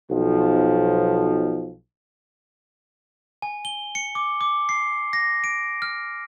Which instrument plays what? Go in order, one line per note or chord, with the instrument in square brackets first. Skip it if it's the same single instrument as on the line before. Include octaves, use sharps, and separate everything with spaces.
[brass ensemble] B1 F3
[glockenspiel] G#5
G7
C#7
D6
D6
C7
A#6
D7
F6